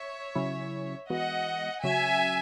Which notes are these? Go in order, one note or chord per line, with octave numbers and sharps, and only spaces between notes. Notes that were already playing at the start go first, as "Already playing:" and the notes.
Already playing: C#5 E5
C#3 F#3 C#4 E4
E3 G#3 B3 F#4 D#5 F#5
C#3 F#3 C#4 F#4 E5 G#5